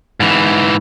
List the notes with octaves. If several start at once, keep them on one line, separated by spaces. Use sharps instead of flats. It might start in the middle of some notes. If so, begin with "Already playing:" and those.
G#2 E3